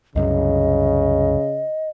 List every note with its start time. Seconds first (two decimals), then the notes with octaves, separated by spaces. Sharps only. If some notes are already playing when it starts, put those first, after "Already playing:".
0.16 C2 F#2 C#3 D#5